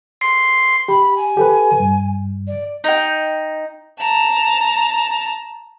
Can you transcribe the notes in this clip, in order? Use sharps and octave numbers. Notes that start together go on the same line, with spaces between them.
C6
G4 B5
G#5
G4 A4 B4
G2
D5
D#4 G5
A5 A#5